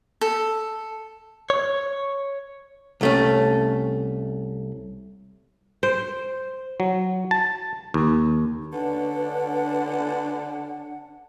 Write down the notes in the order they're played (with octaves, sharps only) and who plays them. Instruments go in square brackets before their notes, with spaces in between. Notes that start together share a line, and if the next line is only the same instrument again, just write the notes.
[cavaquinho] A4
[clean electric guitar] C#5
[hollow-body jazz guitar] C2 A3 C#4
[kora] C5
[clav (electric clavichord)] F#3
A5
D#2
[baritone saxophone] D3 [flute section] C#4 D4 F#5 [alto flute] B4